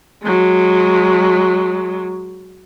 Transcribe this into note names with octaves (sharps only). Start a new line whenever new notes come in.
F#3 G#3